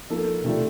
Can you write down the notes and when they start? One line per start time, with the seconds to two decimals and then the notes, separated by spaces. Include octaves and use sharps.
0.10 F3 A#3 D#4 A4
0.44 C3 D#3 A3 D4 F4